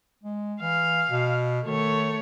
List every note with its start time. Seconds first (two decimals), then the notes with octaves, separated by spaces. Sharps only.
0.23 G#3
0.61 E3 F5
1.10 B2
1.66 D#3 A3 C#5